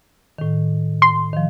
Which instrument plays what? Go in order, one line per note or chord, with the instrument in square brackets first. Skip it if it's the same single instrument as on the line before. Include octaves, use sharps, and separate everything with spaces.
[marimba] A2 D#3
[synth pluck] C6
[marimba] D#3 F3